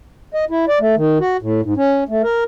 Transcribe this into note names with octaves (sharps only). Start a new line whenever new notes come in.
D#5
E4
D5
A3
D#3
F#4
A2
G#2
C#4
A3
A#4